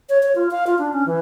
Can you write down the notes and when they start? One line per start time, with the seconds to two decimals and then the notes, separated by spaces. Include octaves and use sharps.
0.09 C#5
0.23 C#5
0.35 F4
0.51 F5
0.67 F4
0.79 D4
0.93 C#4
1.06 E3